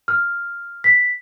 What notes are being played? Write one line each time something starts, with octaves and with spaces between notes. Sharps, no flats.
F6
B6